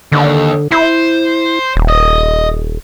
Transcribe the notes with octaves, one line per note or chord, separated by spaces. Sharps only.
D#2 D3
E4 C5
D#1
D#5